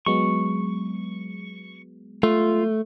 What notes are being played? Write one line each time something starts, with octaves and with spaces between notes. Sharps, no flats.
F#3 G#3 B3 C#6
A3 F4